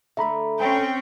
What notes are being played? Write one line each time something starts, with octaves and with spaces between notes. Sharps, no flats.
D3 A3 E5 A#5 B5
C4 C#4 G5